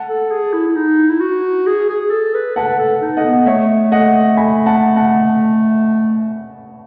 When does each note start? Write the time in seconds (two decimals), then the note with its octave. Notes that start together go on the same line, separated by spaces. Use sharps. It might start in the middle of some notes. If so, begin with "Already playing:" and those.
Already playing: F#5 A5
0.09 A4
0.31 G#4
0.53 E4
0.68 E4
0.76 D#4
1.10 E4
1.21 F#4
1.67 G#4
1.90 G#4
2.11 A4
2.35 B4
2.56 B4 F#5 A5
2.79 A4
3.01 D#4
3.17 D#5 F#5
3.25 B3
3.46 A3 C#5 E5
3.92 D#5 F#5
4.37 G#5 B5
4.66 F#5 A5
4.96 F#5 A5